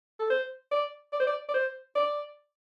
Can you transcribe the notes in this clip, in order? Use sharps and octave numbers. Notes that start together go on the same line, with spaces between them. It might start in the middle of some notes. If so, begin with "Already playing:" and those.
A4
C5
D5
D5
C5
D5
D5
C5
D5